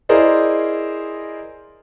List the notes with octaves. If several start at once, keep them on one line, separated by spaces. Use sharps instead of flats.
E4 G#4 A#4 C5 D5 D#5